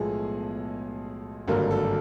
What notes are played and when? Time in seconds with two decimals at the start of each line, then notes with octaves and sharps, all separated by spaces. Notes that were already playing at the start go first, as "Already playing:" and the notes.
Already playing: B1 A2 F3 G#3 B3 G#4
1.48 G#1 G2 D3 F#3 A#3 A#4
1.71 A4